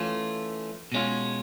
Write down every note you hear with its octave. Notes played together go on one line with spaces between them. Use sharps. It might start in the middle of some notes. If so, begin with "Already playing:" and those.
Already playing: E3 A3 C#4 F4
B2 G#3 C#4 F4